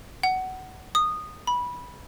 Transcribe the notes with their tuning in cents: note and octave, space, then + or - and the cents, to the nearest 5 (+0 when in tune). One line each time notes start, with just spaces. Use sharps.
F#5 +15
D#6 -15
B5 -15